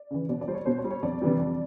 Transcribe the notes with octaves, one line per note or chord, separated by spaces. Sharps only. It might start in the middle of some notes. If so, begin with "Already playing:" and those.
Already playing: D5
C#3 E3
B2 D5
D5
G3 C5
C#5
B2 C5
C#5
G3
C#5
F2 D5
C3 E3 G3
F2